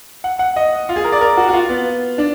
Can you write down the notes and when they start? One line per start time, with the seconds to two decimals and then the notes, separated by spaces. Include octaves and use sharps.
0.24 F#5
0.39 F#5
0.56 D#5
0.89 F4
0.96 G#4
1.04 A#4
1.12 D5
1.21 A#4
1.37 F#4
1.49 F#4
1.53 F4
1.69 B3
2.18 D4